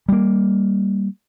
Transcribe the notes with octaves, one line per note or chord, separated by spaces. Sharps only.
G3 A#3